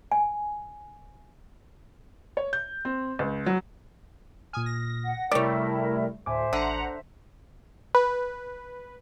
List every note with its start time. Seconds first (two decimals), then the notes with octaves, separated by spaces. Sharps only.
0.12 G#5
2.37 C#5
2.53 G6
2.85 C4
3.19 C#2
3.46 F#3
4.53 A#2 G#5 D#6 F6
4.66 A#6
5.05 F#5
5.31 C3 G3 A3 E4 A#4 C#5 D5 G5
6.26 D2 A2 C5 E5 G#5 D6
6.53 A1 D3 F#5 A#5
7.95 B4